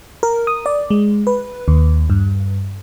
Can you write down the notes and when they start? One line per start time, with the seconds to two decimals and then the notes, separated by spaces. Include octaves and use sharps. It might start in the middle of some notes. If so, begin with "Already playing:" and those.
0.23 A#4
0.47 D#6
0.66 D5
0.90 G#3
1.27 B4
1.68 D#2
2.10 G2